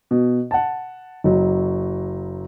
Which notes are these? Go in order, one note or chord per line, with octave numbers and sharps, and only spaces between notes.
B2
F#5 A5
F#1 F#3